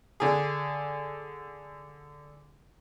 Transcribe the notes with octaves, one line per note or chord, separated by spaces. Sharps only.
D3 G#4